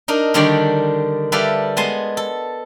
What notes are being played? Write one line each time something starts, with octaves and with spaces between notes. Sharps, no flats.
D4 D#4 A#4
D3 D#3 G3 D4 C#5 D5
G3 A4 B4 D5 E5 F5
G#3 B3 G#5 A5 C6
A4